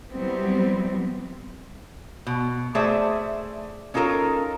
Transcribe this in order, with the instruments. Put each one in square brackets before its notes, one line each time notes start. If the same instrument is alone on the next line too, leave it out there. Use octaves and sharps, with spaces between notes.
[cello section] E3 F#3 G3 B3 C4
[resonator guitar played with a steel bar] B2
A3 G#4 C5 D5 E5
C#4 D#4 F4 A4 A#4